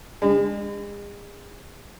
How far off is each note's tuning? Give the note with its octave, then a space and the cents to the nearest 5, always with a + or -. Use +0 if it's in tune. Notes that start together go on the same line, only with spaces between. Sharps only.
G#3 -40